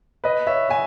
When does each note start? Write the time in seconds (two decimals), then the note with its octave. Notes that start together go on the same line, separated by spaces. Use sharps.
0.24 B4 D#5
0.47 C#5 E5
0.69 E5 G#5